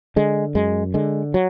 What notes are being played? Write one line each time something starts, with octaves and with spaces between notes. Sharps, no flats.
D3 G#3
F#2 G#3
D3 G#3
F#3